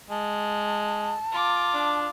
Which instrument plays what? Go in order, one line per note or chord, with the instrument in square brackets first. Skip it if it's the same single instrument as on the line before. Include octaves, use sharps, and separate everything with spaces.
[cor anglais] G#3 [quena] A5
[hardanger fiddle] F4 D6
[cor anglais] D4